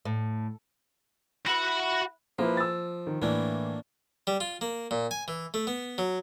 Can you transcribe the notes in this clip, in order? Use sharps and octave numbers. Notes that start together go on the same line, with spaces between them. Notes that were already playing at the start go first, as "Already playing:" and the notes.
A2
E4 F#4 B4 F#5
F3 A#3 E4 B4
E6 A6
D#3
A2 E3 A#3 D4
G3
F4
A#3
A#2
G#5
E3
A3
B3
F#3